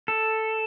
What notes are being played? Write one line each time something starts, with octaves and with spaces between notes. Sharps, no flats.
A4